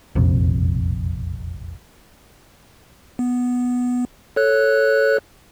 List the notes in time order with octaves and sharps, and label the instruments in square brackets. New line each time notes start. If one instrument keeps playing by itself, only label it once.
[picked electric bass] E1 A#1 F2 C3
[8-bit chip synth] B3
A4 C#5 F#6